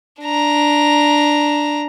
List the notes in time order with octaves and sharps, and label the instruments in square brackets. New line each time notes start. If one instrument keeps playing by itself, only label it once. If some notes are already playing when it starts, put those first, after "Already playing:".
[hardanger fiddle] D4 A#5